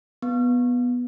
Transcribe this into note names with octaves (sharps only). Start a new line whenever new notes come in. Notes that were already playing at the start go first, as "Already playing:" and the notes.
B3